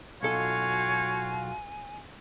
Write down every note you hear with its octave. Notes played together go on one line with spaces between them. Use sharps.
B1 F4 F#4 A4 C#5 F5 G#5